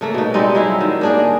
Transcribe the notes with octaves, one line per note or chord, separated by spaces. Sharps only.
C#3 A3 A#3
B2 D#4
G3 G#3 C4 D#4
F#3 E4 F5
D#3
A#3 D4 G#4